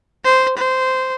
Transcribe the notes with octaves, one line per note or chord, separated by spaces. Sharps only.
C5
C5